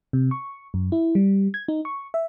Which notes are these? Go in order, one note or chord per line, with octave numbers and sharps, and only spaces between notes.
C3
C#6
F#2
E4
G3
G#6
D#4
C#6
E5